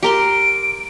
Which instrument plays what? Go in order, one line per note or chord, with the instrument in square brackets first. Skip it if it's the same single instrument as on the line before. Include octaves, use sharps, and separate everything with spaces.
[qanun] G4 A#4 C6 [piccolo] D7